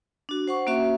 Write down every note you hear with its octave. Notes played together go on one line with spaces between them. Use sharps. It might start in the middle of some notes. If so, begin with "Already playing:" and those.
D4 F#4
C5 F#5 C#6
A#3 C#4 F#4 E5 C#6